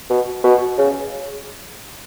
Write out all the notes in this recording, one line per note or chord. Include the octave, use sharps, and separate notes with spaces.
B2
B2
C#3